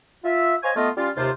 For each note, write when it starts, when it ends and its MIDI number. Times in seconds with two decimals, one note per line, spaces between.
0.24 0.56 65
0.24 0.56 76
0.63 0.71 72
0.63 0.71 73
0.63 0.71 75
0.63 0.71 77
0.63 0.71 80
0.76 0.89 57
0.76 0.89 59
0.76 0.89 65
0.76 0.89 75
0.97 1.10 55
0.97 1.10 61
0.97 1.10 65
1.17 1.30 39
1.17 1.30 48
1.17 1.30 65
1.17 1.30 72